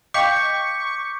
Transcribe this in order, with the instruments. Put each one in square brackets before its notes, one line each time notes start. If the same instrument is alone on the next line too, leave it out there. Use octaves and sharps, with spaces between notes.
[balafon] D#5 F5 G5 [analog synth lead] C#6 [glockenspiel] D6 G6 B6